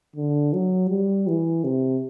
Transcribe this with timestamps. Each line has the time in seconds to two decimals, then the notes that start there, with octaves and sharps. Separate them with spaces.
0.16 D3
0.53 F#3
0.90 G3
1.28 E3
1.64 C3